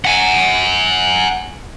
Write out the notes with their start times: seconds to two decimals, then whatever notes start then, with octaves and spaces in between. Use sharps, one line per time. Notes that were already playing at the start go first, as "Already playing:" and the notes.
0.05 F#5 G#5